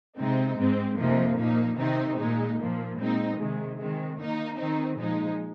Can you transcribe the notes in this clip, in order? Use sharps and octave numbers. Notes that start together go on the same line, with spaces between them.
C3 G#3 C4 D#4
G#2 G#3 C4
F2 C3 F3 A#3 D#4
A#2 F3 A#3 D#4
C3 D#3 C4 D#4
A#2 G#3 D#4
A#2 F3 A#3
A#2 G#3 C4 D#4
C3 D#3 G#3
D#3 G#3 C4
D#3 A#3 D#4
D#3 C4 D#4
A#2 F3 G#3 D#4